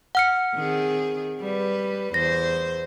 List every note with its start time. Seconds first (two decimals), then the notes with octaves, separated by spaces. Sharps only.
0.15 F#5 F6 C#7
0.55 D#3 C4 G#4
1.41 G3 B4
2.14 E2 C5 A#6